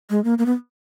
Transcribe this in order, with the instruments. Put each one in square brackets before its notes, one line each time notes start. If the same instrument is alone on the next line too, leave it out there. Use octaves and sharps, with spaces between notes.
[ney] G#3
A#3
A#3
B3